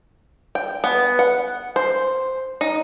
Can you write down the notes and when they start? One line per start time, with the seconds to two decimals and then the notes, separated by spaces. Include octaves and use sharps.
0.55 G5
0.84 B3
1.19 F#5
1.76 C5
2.61 D#4